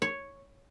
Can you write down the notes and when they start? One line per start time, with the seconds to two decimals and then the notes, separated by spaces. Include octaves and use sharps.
0.02 C#5